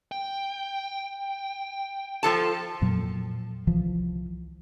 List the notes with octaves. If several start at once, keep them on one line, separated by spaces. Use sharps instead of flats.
G5
F3 A4 A5
F2 A#2 F#3
C2 E3 F3